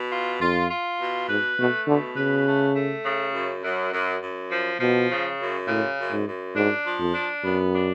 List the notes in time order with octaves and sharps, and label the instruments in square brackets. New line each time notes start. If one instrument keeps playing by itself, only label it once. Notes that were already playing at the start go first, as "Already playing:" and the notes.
Already playing: [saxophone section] B2
F4
[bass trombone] F2 [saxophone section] F4
[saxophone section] F4
B2
[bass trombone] G#2 [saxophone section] B4
[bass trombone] B2 [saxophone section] A3
[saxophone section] B2 [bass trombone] D3
[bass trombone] C#3 [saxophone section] B4
[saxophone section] A3
A3
C#3
F#2
F#2
F#2
F#2
F3
[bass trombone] B2 [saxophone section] F3
[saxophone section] C#3
F#2
[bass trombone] A2 [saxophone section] C#3
[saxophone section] F#2
[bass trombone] G#2
[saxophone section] F#2
[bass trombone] G#2 [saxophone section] D4
[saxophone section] F3
[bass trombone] F2
[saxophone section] D4
[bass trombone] F#2 [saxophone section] B3
[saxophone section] D4